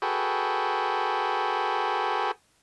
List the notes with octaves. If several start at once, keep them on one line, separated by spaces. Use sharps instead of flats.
F#4 G#4 A4 B4 G5